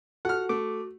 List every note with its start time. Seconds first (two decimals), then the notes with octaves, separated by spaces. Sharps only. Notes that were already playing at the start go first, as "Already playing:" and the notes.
0.25 F#4 A4 F#5 F6
0.49 A3 D6